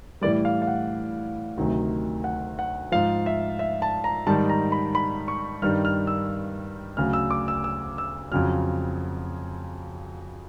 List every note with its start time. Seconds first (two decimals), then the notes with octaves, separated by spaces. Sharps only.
0.21 A2 E3 G3 D5
0.45 F5
0.62 F5
0.67 F#5
1.58 D2 C3 D#3 F#3
2.24 F#5
2.59 F#5
2.92 G#2 F3 F5
3.26 E5
3.59 E5
3.82 A5
4.04 A#5
4.27 G#2 D#3 G3 A5
4.49 A#5
4.72 B5
4.95 B5
5.28 C#6
5.62 G2 D#3 G3 F6
5.85 F6
6.07 E6
6.97 D2 C#3 F#3 F6
7.13 E6
7.31 D6
7.48 E6
7.64 E6
7.98 E6
8.32 F2 C#3 F#3 F6